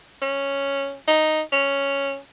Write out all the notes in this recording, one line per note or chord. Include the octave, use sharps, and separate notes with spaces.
C#4
D#4
C#4